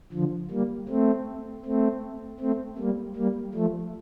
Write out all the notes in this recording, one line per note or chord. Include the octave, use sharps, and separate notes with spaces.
D3 F3
G3 A#3
A3 C4
A3 C4
A3 C4
G3 A#3
G3 A#3
F3 A3